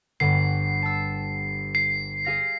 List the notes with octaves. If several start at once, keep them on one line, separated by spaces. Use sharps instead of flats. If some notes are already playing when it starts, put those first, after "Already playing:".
G1 G2 F#5 C7
A5 E6
C7
G#4 F5 A#6